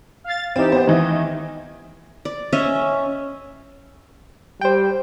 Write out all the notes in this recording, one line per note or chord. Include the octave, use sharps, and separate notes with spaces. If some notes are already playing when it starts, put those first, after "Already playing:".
F5 A6
E3 C4 D#4 G4
B3 G4 C5
D#3 E3 E4 D#5
D5
C#4 D#5 E5
G3 C5 G5